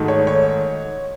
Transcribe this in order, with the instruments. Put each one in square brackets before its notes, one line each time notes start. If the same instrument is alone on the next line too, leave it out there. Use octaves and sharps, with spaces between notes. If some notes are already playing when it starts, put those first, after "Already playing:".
Already playing: [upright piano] G#2 D#3 A3 D#4 F#4
[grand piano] C#5
C#5